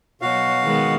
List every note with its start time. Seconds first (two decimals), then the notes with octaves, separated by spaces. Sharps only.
0.22 B2 F#3 F#4 F5
0.63 D#3 G#3 B3